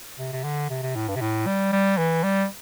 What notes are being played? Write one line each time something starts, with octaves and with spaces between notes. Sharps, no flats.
C3
C3
D3
C3
C3
A2
G2
C3
A2
G3
G3
E3
G3